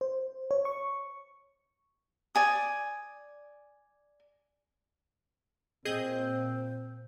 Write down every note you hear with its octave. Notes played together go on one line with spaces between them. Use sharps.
C5
C#5
C#6
D5 G#5 D#6
A#2 C4 G#4 C5 D#5 G6